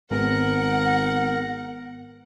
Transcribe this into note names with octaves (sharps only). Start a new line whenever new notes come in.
G#1 G#2 B3 A#4 F#5